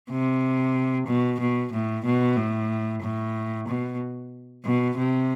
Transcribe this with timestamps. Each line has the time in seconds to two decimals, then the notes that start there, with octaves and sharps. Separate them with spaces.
0.10 C3
1.07 B2
1.40 B2
1.72 A2
2.05 B2
2.37 A2
3.02 A2
3.68 B2
4.65 B2
4.98 C3